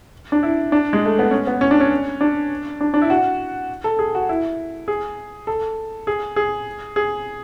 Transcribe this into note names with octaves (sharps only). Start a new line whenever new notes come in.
D4
E4
D4
G#3
A3
B3
C#4
B3
C#4
D4
C#4
D4
D4
D4
E4
F#4
A4
G#4
F#4
E4
G#4
A4
G#4
G#4
G#4